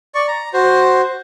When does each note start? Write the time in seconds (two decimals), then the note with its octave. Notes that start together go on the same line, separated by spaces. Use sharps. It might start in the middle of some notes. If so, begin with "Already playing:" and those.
0.15 D5 C#6
0.28 A#5
0.54 F#4 C5